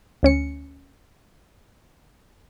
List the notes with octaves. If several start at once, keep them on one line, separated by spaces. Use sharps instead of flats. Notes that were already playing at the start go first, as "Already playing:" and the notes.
D2 C#4 C#7